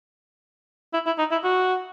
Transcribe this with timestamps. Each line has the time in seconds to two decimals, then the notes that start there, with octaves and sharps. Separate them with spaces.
0.93 E4
1.06 E4
1.18 D#4
1.31 E4
1.44 F#4